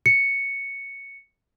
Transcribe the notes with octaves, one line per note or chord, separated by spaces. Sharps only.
C#7